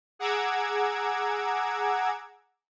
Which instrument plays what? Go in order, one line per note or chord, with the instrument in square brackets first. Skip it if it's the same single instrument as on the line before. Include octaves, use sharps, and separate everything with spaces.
[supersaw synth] G#4 F#5 A#5 D6 E6 G#6